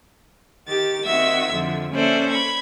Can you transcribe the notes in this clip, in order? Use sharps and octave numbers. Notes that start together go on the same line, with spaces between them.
D#3 G4 A6
D#3 C4 F#4 E5 E6 G#6
F2 D3 F3
A#3 C#4 A4 C5 D5 E5
B5 G#6